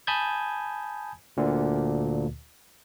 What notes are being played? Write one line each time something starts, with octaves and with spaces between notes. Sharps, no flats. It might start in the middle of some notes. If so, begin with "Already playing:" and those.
G#5 A5 B5 D#6 G6 G#6
D2 A#2 D3